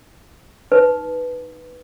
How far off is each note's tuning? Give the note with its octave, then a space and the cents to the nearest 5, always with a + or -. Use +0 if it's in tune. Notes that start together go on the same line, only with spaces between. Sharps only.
D#4 +0 B4 +0